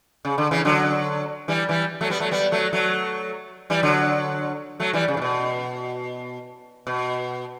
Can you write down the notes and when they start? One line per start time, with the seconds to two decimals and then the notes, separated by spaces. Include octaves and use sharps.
0.25 C#3
0.38 D3
0.51 C#3 E3
0.65 D3 F#3
1.48 E3 G3
1.68 E3 G3
2.01 F#3 A3
2.10 G3 B3
2.20 F#3 A3
2.31 G3 B3
2.52 F#3 A3
2.73 F#3 A3
3.70 E3 G3
3.83 D3 F#3
4.80 F#3 A3
4.93 E3 G3
5.08 C#3
5.17 A2
5.22 B2
6.87 B2